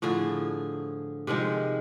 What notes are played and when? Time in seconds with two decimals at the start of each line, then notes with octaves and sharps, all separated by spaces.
0.02 A2 D3 F3 G#4
1.27 C3 D#3 F3 G#3